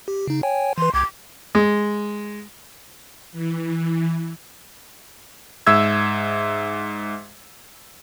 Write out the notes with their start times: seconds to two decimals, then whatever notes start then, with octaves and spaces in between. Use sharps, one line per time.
0.08 G4
0.28 C#3 D#4
0.43 C#5 G5 G#5
0.78 E3 B4 C6
0.94 C2 D6 G#6
1.55 G#3
3.32 E3
5.67 G#2 E5 E6 G#6